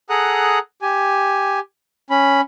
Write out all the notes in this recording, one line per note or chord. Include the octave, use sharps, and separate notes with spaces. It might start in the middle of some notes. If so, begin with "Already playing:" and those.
G#4 A4 F#5 A#5 D#6 F#6
G4 G#5
C#4 B5